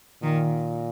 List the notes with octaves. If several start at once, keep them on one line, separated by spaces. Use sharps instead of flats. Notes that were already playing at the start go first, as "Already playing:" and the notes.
A#2 D#3